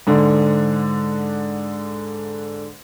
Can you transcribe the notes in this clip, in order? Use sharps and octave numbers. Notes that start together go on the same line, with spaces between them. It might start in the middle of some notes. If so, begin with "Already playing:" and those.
G#2 D3 D4